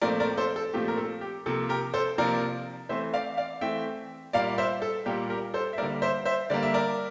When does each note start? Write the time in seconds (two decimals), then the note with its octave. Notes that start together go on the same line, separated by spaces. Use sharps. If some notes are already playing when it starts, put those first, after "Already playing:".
0.02 A#2 F3 A3 C4 A#4 D5
0.20 A#4 D5
0.37 A4 C5
0.56 A4
0.73 A#2 F3 A3 C4 G4
0.88 A#4
0.97 A4
1.21 G4
1.46 C3 F3 A#3 A4
1.69 G4 A#4
1.94 A4 C5
2.18 C3 F3 A#3 A#4 D5
2.89 E3 A3 C4 C5 E5
3.14 D5 F5
3.37 D5 F5
3.61 E3 A3 C4 E5 G5
4.33 A#2 G3 A#3 D5 F5
4.58 C5 E5
4.82 A4
5.06 A#2 G3 A#3 G4
5.30 G4 A#4
5.54 A4 C5
5.73 E5
5.78 D3 G3 A#3 A#4 D5
6.02 C5 E5
6.25 C5 E5
6.50 D3 G3 A#3 D5
6.63 E5
6.74 A#4 D5